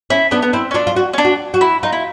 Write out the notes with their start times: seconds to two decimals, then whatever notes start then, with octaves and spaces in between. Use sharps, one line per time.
0.10 C#4 E4
0.31 B3 D4
0.42 B3
0.53 C4 E4
0.71 C#4
0.74 D4 F4
0.87 F4
0.96 F#4
1.13 C#4
1.18 D4
1.25 F#4
1.54 F#4
1.61 E4
1.83 D#4 F4
1.93 E4